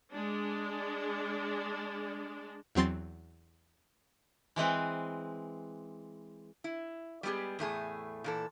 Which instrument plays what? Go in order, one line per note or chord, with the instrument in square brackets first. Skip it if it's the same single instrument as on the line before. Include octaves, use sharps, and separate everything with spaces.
[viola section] G#3 D4
[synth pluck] E2 F#3 C4 C6 A6
[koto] E3 G#3 C4 B4
[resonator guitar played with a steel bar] E4
G3 G#3 B3 G4 G#4
E2 A2 A3 G#4
A#2 E3 A4